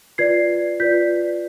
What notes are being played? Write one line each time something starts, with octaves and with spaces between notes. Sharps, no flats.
F4 B4 D5 G#6 C7
F4 B4 D5 G6 B6